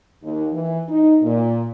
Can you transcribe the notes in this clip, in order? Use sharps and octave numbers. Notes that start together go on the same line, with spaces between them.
D#2
E3
D#4
A#2